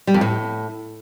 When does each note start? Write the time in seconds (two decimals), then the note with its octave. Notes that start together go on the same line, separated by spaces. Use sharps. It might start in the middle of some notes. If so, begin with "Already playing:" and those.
0.07 G3
0.14 F2
0.21 A2